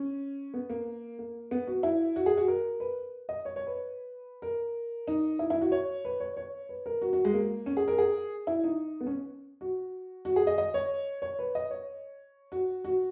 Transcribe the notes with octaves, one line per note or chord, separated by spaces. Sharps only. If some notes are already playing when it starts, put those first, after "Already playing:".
Already playing: C#4
B3
A#3
A#3
B3
F#4
E4
F#4
G#4
F#4
A#4
B4
D#5
C#5
C#5
B4
A#4
D#4
E4
E4
F#4
C#5
B4
C#5
C#5
B4
A#4
F#4
F#4
G#3
A#3
C#4
G#4
A#4
G#4
E4
D#4
B3
C#4
F#4
F#4
G#4
D#5
D#5
C#5
C#5
B4
D#5
C#5
F#4
F#4